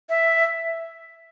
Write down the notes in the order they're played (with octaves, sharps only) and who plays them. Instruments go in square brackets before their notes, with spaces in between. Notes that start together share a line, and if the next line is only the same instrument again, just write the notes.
[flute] E5